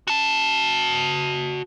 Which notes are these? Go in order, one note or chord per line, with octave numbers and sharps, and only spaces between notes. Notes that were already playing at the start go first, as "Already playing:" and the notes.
F#4 A5